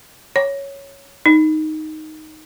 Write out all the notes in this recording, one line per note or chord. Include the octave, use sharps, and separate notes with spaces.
C#5
D#4